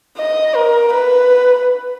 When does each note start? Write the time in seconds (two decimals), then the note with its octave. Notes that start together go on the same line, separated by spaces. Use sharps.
0.18 D#5
0.55 A#4
0.93 B4